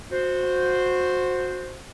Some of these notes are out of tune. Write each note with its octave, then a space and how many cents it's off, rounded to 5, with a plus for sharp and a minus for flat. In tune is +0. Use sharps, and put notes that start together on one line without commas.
F#4 -20 C5 +0